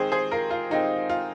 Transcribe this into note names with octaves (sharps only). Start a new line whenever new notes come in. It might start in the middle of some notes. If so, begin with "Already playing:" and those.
Already playing: D#3 G#3 C4 G#4 C5
G#4 C5
F4 A#4
F4
D#3 G#3 C4 D#4
F4